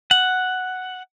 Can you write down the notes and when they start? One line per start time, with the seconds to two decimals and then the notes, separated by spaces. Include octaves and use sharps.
0.11 F#5